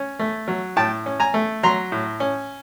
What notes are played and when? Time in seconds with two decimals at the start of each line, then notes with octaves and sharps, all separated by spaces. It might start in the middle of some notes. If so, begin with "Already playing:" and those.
Already playing: C#4
0.20 A3
0.48 F#3
0.76 A2 G5 A5
1.06 C#4
1.20 G#5 A#5
1.34 A3
1.63 F#3 A#5 C6
1.92 A2
2.20 C#4